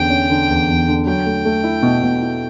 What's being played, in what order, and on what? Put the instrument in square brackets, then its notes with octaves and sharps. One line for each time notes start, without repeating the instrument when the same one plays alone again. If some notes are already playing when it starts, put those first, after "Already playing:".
Already playing: [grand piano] E2 D3 C#4 [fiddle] G5
[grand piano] C#4
D3
E2
E2
D3
[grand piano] F#3 [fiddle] G5
[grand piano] A3
A3
E4
B2
B2
E4